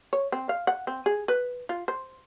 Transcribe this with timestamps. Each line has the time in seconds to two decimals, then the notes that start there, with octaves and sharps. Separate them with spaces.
0.13 C#5
0.32 C4
0.49 F5
0.67 F#5
0.87 C4
1.06 G#4
1.28 B4
1.69 F4
1.88 C5